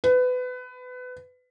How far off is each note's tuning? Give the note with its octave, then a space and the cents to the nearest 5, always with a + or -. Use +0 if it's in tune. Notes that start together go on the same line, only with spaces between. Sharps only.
B4 +25